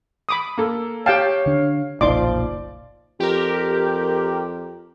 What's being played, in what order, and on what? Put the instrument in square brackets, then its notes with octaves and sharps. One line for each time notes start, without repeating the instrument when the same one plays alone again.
[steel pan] B5 D6 D#6
[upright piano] A#3 A4
[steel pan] G4 G5 A5 [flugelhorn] C#5 [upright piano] F5
[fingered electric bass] D3 D4
[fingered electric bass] F#1 B1 A#2 [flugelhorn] F3 [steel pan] D#4 C6 D6 [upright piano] D5
[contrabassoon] F2 [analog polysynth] G4 A#4